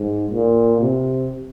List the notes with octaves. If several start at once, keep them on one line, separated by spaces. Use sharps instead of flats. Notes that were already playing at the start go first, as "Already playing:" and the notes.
Already playing: G#2
A#2
C3